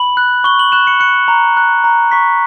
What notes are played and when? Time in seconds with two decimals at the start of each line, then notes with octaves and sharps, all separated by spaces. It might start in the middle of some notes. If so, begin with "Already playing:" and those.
Already playing: B5 F#7
0.17 F#6
0.44 C#6 G7
0.59 F#7
0.72 F#6 E7
0.87 C#7
1.00 F#6 C#7
1.28 A#5
1.57 F#6
1.84 A#5
2.11 C#6 B6